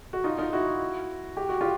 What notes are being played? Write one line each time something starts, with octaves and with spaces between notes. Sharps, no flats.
F#4
D#4 F4
D#4 F4
E4 F#4
G4
F#4
F4 G4